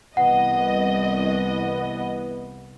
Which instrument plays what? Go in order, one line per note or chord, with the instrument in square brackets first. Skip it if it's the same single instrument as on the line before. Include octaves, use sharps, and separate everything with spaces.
[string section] C2 D#5 [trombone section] E3 B3 [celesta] F#5